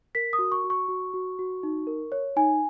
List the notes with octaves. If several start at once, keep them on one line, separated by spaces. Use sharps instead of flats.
A#4 B6
D#6
F#4
C#6
F#4
C#6
F#4
F#4
F#4
D#4
A#4
C#5
D#4 G#5